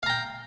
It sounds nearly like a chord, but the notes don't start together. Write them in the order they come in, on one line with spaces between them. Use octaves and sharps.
F5 A#5 G5